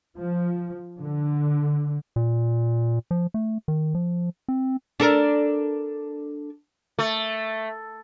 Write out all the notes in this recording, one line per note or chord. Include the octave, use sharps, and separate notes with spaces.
F3
D3
A#2
F3
A3
D#3
F3
C4
D4 A4 A#4
A3